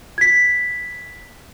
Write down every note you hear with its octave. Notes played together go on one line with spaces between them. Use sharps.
G#6 B6